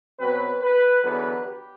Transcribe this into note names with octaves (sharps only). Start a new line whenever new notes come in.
B2 F#3 C4 B4
B4
E2 D3 F#3 B3 B4
G4